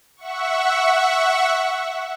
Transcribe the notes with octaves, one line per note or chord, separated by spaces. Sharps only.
E5 F#5 C#6